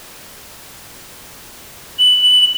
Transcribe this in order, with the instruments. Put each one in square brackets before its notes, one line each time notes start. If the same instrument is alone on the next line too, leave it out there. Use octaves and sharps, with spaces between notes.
[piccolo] F#7